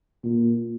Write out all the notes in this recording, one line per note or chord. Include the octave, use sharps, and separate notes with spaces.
A#2